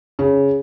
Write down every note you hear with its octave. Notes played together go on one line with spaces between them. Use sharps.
C#3